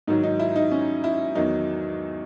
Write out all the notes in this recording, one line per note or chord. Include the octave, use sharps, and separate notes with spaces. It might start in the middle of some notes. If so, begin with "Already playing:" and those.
G#2 D#3 F#3 D#4
D#4
E4
D#4
C#4
E4
E2 D#3 F#3 D#4